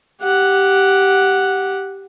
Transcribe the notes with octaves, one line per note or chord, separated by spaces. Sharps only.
G4 F#5